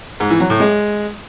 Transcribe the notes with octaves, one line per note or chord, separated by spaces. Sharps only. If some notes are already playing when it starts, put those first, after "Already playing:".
G#2
E3
F#3
A2
G#3